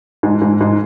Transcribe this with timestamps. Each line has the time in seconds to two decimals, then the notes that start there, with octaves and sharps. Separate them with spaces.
0.23 G#2
0.42 G#2
0.61 G#2